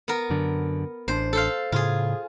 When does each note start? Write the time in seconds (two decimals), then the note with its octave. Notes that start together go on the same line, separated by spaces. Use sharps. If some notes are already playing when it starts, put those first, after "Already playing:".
0.08 B3 A#4
0.30 F#2 D3
1.08 A1 C4 D4 C5
1.33 A4 C5 F5
1.72 A2 C#3 F4 G#4